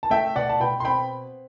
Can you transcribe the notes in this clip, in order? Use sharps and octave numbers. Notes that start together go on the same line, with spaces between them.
A5
A3 E5 G5
B2 D5 F#5
A5
B2 G5 B5
C6
C4 G5 B5